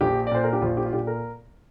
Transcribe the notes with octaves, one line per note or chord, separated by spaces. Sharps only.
A#1 G4
D5
A#2 C5
A#4
G4
A#1 F4
G4
F4
A#2 G4
A#4